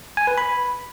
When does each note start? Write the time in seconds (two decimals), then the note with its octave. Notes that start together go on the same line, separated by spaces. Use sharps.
0.17 G#5
0.27 B4
0.38 B5